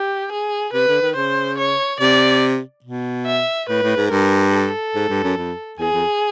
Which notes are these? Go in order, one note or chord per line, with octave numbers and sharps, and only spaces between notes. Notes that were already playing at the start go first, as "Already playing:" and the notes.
Already playing: G4
G#4
C3 B4
D3
D#3
C#3 C5
C#5
C3 D5
B2
E5
A2 B4
A2
G#2
G2 A#4
A4
G#2
G2
F#2
F2
E2 G#4
F2